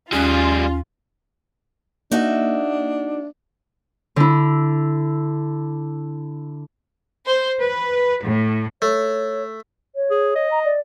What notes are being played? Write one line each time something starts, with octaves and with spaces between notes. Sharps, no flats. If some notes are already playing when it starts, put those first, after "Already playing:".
D#2 G3 C#4 F4 G#4 F5 F#6
A#3 D4 D#4 F#4 E5
D3 E4
C5
B4
A2
A3 C#5
C#5
G#4
D#5
A#5
D5